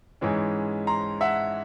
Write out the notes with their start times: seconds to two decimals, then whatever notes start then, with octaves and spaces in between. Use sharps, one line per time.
0.21 G#2 E3 G#3 C#4
0.87 A#5 C6
1.21 E5 F#5